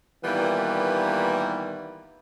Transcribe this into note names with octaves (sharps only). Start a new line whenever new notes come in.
A#2 D#3 E3 G3 A#3 B3